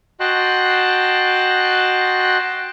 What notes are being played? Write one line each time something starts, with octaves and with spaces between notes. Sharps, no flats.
F#4 D#5 G5 A5 C6 F#6